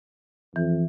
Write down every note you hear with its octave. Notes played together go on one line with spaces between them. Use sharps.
F2 E3